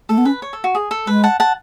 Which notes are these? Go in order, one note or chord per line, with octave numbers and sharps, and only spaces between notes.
A3 A4
B3
C#4 B4
C#5
A4
F#4
G#4
A4
G#3 B4
F#5 A5
F#5 A5